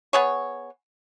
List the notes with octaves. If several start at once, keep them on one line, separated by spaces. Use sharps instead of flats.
B3 G#4 C#5